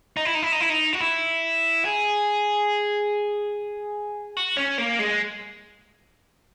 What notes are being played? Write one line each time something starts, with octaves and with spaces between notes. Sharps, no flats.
D#4
E4
D#4
E4
D#4
E4
D#4
F#4
E4
G#4
F#4
C#4
A#3
G#3